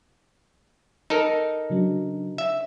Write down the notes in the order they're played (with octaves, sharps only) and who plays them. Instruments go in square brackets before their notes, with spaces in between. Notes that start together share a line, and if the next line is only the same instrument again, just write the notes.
[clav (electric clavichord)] D#4 A4 A#4
[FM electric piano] C#3 F#3 D4
[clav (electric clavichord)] E5